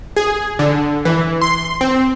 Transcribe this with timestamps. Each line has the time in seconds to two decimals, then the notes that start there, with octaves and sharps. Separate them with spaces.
0.17 G#4
0.59 D3
1.05 E3
1.42 C6
1.81 C4